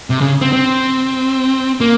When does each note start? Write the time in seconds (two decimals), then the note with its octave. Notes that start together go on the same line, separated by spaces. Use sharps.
0.10 C3
0.21 C#3
0.41 C4
0.53 C4
1.81 A#3